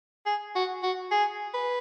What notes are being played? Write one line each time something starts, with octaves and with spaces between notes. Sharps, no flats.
G#4
F#4
F#4
G#4
B4